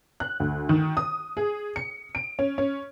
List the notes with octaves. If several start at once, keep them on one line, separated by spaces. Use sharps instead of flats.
F#6
D2
D#3
D#6
G#4
C#7
D7
C#4
C#4